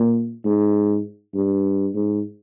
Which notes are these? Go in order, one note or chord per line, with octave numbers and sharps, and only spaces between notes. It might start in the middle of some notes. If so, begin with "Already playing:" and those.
Already playing: A#2
G#2
G2
G#2